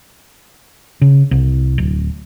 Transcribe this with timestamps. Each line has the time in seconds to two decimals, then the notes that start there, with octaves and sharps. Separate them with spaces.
1.01 C#3
1.31 C2
1.78 D1